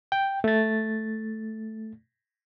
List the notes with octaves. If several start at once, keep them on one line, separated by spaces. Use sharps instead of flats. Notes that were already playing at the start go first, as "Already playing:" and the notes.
G5
A3 A6